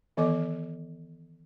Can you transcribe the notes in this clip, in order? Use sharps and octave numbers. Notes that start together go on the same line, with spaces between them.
D#3 E3 B3 A4 D#5 D6